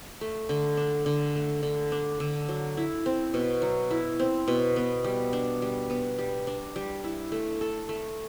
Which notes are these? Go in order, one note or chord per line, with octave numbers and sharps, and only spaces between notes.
A3
D3
D4
D3
A3
D3
D4
D3
F#3
E4
C4
B2
F#3
E4
C4
B2
B3
G3
D4
G3
B3
G3
D4
G3
E4
A3
A4
A3